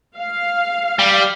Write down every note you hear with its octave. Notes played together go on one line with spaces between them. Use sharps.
F5
G3